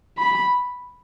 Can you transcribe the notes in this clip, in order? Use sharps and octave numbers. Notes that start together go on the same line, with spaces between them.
B5